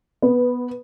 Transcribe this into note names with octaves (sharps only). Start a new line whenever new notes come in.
B3